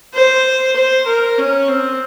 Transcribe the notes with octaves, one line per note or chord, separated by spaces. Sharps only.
C5
C5
A#4
C#4
C4